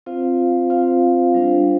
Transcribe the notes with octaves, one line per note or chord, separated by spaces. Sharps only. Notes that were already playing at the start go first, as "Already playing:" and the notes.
C4 F4 C5 F5
C4 F4 C5 F5
G3 D4 F4 C5